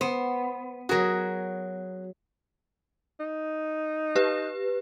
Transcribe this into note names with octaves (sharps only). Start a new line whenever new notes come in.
B3 C5
F#3 F#4 G#4 A#4
D#4
G4 B4